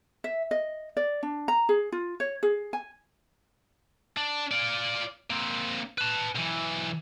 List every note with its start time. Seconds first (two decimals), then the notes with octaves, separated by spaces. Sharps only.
0.24 E5
0.51 D#5
0.97 D5
1.23 D4
1.48 A#5
1.69 G#4
1.92 F4
2.20 C#5
2.43 G#4
2.73 G#5
4.17 D4
4.51 F4 D5
5.30 A#3 C4
5.98 B4 A5
6.35 B1 E3